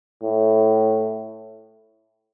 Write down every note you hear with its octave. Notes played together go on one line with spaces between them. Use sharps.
A2